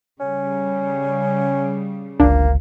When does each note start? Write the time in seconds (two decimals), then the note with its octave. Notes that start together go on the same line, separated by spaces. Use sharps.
0.20 C#3 G3 C#4
2.20 G1 C#2 A#3 D4